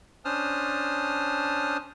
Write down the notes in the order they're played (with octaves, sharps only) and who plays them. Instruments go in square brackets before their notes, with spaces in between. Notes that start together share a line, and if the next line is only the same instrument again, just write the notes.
[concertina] C#4 D4 C5 A5 D#6 F6